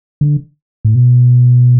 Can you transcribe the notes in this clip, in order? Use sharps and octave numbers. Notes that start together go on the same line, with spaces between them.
D3
A2
B2